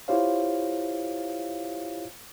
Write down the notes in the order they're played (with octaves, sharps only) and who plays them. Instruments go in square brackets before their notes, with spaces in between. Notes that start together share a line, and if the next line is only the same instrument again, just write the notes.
[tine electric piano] E4 F4 G4 C5 C#5 F5